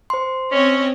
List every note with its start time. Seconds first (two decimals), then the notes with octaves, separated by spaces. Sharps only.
0.10 C5 C6
0.52 C4 C#4 C#5 D#5